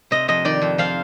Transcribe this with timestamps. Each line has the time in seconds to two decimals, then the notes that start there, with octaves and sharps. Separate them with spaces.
0.11 C3 D#5
0.28 F2 D#5
0.45 D#3 D5
0.62 F2
0.78 F3 F5